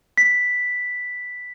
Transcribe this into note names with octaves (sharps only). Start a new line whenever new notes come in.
B6